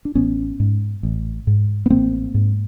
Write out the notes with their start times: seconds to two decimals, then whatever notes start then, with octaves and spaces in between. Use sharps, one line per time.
0.05 D4
0.15 A1 B3 C#4
0.60 G#2
1.03 A1
1.47 G#2
1.86 B3
1.90 A1 A#3 C4
2.34 G#2